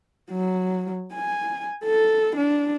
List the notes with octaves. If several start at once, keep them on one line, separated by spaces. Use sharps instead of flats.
F#3
G#5
A4
D4